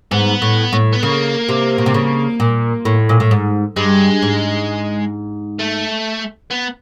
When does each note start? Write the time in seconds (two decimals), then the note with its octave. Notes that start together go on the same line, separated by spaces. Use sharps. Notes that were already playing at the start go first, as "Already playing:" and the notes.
0.11 G#2 B3
0.42 A2
0.73 A2
0.93 B3
1.03 C#3 A#3
1.49 C3
1.78 B2
1.86 C3
1.94 C#3
2.40 A#2
2.85 A2
3.09 A#2
3.20 A2
3.31 G#2
3.76 G2 G#3
4.23 G#2
5.59 A3
6.51 B3